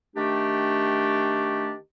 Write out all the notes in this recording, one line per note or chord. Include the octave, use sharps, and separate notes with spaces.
D#3 A3 D4 G4